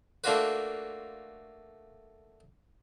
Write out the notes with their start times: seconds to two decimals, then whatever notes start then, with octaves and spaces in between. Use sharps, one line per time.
0.24 A3 A#3 D4 F4 F#4 B4